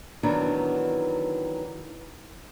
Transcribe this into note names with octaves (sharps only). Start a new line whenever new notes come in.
D#3 E3 F#3 B3 D4